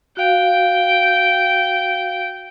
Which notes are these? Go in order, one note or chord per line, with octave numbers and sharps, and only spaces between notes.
F#4 F5 G5